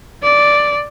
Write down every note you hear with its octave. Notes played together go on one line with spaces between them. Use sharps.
D5